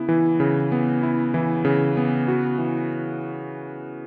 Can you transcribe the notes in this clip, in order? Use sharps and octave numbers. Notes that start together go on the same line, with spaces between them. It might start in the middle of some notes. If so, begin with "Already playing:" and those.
Already playing: C#3 B3 E4
E3
C#3
B3
E4
E3
C#3
B3
F#4
E3